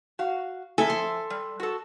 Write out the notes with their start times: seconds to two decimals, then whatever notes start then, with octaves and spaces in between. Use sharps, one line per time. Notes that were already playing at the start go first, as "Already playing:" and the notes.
0.19 F#4 F5
0.78 F2 E4 A4 E5 G#5
0.90 C6
1.30 G3
1.60 F#4 A4